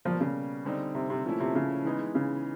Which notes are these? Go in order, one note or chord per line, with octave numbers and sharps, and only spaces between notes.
B2 F3 G3 A#3
C#3
D3 G3 C4 D#4
C3
C3
A#2 F3 A3 C#4 E4
C3
C#3
E3 G#3 B3 D#4
C#3